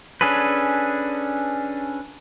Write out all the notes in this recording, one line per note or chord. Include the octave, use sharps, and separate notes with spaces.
C#4 D4 G#4 A4 B4